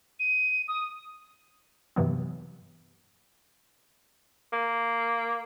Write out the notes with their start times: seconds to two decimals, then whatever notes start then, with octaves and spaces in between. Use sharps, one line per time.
0.20 D#7
0.68 D#6
1.96 G2 C3 E3 F#3 B3
4.53 A#3